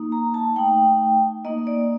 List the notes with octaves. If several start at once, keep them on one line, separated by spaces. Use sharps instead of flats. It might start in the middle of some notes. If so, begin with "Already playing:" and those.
Already playing: A#3 D#4
A#5
A5
A3 D#4 G5
A#3 D#4 D#5
D5